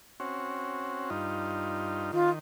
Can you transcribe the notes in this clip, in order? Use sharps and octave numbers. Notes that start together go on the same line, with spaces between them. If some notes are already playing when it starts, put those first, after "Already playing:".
C4 C#4 F#4
G2 D#4 F4
D#3 F4